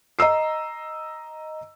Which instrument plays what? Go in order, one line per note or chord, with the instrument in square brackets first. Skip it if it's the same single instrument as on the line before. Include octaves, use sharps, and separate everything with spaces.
[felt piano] D#5 A#5 E6 C7